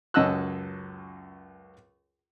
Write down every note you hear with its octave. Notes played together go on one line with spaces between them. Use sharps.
C#2 F#2 D#5 A5 E6 F#6